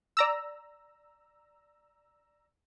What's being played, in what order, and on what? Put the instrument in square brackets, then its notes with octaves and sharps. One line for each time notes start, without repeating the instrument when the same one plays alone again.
[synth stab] D5 A#5 E6